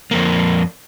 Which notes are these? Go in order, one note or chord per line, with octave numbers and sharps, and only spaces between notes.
F2 A#3